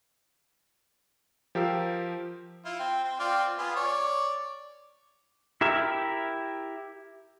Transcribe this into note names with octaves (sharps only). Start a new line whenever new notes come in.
F3 G4 A#4 F5 E6
E4 F4
C4
C4
C4 F4 D5
B3 F4 G#4
C#5 D5
E4 G4 A#4 E5